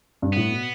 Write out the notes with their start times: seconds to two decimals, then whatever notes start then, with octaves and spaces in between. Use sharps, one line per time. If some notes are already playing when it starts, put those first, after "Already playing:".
0.22 G2
0.33 A2 B3
0.51 B2